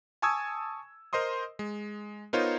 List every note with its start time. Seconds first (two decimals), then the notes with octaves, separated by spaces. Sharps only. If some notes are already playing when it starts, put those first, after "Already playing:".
0.22 G#5 A5 C#6 D#6 E6 G#6
1.13 A#4 C5 D#5 C6 D#6
1.59 G#3
2.33 B3 D#4 F4 A#4 C5 C#5